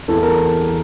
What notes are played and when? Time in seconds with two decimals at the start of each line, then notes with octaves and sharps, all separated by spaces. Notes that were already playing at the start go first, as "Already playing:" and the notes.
0.08 E2 E3 A4
0.22 A#4